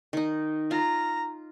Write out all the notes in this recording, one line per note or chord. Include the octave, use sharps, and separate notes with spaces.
D#3 D#4
F4 A#5